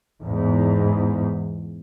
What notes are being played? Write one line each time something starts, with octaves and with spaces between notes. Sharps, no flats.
E2 G#2